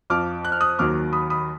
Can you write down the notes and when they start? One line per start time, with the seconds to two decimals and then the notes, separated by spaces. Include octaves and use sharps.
0.10 F2 F3 D6 F6
0.45 F#6
0.52 F6
0.61 D#6 F#6
0.79 D#2 D#3 F#3 D6 F6
1.13 B5 D#6
1.30 B5 D#6